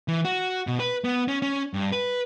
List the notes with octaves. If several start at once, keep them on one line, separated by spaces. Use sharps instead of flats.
E3
F#4
B2
B4
B3
C#4
C#4
G2
B4